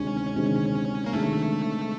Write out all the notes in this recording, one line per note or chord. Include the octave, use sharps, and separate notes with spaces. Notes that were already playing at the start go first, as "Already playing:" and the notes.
Already playing: D2 C3 D#3 G#3 C#4
D2 C3 D#3 G#3
A#3
D2 C3 D#3 G#3 A3